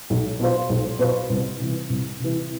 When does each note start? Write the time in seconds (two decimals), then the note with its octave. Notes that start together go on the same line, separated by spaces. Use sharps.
0.10 B1
0.40 B2 B3 F4 C5
0.70 B1
0.99 B2 B3 F4 C5
1.30 C2
1.60 C3 E3
1.90 C2
2.20 C3 E3